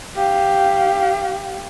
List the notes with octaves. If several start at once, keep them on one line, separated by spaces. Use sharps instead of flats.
G4 F5